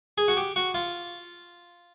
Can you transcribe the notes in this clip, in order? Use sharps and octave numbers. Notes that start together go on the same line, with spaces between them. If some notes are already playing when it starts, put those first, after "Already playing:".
G#4
F#4
G4
F#4
F4